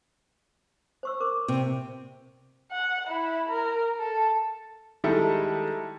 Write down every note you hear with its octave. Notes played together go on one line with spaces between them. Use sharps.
C5 C#6 E6
A#4 C5 D6
C3
F#5
E4
A#4
A4
D#3 G3 G#3 E4 G4 A4